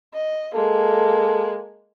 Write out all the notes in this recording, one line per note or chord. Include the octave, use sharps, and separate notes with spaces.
D#5
G#3 A#3 A4